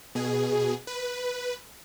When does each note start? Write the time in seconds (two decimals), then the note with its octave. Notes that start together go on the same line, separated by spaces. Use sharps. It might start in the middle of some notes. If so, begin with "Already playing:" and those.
0.15 B2 G#4
0.87 B4